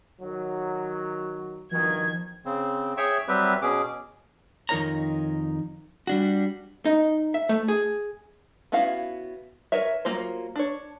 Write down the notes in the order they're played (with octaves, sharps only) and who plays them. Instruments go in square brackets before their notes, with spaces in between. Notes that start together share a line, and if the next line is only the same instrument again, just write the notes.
[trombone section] D#3 F#3
[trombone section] G2 B2 D#3 [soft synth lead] F3 [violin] G#6
[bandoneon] C#3 C4
G#4 C#5 E5 G5 C#6 E6
F#3 G3 C4 G4 B4 E5
B2 C#4 G#4 D6
[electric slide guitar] F2 D#3 D#4 A#4 C#5 A#5
G3 D4 F#4
[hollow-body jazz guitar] D#4
E5
A3
G#4
[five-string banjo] B3 C#4 E4 F#4 F5
A#4 B4 C#5 E5
F#3 A#3 F4 C5
D4 C#5